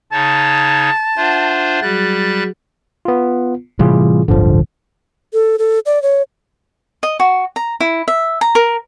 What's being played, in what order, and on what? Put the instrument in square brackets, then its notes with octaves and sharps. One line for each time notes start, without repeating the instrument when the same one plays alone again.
[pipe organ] C#3 D#4 C#5 [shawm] A5
[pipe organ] D4 F4 C5 [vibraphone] E5 F#5
[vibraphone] F#3 F#4 G#4 [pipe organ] G3 F#6 A6
[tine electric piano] B3 F4
[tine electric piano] A2 F4 G#4 [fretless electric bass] C3 E3 G3
[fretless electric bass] D1 G1 [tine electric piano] D3 F3
[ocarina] A4
A4
D5
C#5
[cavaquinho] D#5
F#4
A#5
E4
E5
A#5
A#4